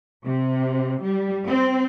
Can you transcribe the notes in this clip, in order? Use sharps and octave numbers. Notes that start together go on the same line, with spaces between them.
C3
G3
C4